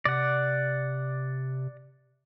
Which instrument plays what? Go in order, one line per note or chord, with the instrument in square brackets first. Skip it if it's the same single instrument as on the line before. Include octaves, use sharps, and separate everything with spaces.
[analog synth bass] C3 [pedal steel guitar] D5 F#5